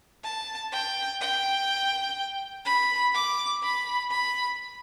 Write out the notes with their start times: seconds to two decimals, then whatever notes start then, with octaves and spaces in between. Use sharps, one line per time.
0.24 A5
0.72 G5
1.21 G5
2.65 B5
3.14 D6
3.63 B5
4.11 B5